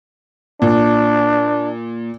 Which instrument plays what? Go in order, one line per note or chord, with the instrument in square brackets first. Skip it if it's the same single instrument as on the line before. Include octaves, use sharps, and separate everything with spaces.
[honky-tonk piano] A#2 [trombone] D4